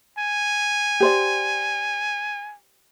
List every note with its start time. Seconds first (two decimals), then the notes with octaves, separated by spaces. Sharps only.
0.19 G#5
1.00 G4 C5 D5